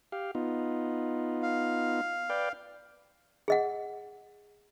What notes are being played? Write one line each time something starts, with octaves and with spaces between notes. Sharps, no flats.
G4 F5
B3 D#4 F4
F5
B4 D5 G5
G#4 D#5 F#5